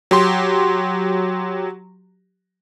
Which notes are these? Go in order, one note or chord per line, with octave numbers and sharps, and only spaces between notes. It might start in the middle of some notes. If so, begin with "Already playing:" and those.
F#3 G4 C6